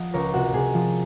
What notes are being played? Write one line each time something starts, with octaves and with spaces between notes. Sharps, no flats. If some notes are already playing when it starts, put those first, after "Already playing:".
Already playing: F3 D#5 F#5 A#5
C#2 A#4 C#5
C3 F#4
C3 G#4
F3